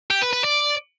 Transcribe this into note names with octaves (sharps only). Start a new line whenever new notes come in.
G4
B4
B4
D5